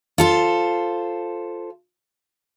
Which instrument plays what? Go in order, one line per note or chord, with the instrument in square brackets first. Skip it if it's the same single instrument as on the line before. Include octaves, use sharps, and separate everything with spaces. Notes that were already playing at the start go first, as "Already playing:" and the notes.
[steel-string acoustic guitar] F4 A4 C5